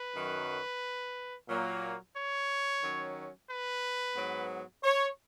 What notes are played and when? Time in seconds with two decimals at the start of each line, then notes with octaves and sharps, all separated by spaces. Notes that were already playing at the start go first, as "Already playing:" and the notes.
Already playing: B4
0.14 F#2 D#3 F#3
1.48 A#2 F#3 A#3
2.15 C#5
2.82 D#3 F#3 C#4
3.50 B4
4.16 G#2 F#3 B3
4.84 C#5